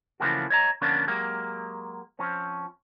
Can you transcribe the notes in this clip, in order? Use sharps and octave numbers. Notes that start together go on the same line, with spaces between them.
C#3 E3 F3 A3 A#3 F#4
C#5 D#5 A#5
D3 F3 A#3 B3 C#4 D4
F#3 G#3 A#3 G4
F3 C4 C#4